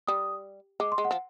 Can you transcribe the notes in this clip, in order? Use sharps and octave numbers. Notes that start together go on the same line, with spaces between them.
G3 D#6
G#3 D6
C6
G#3
F#5
F3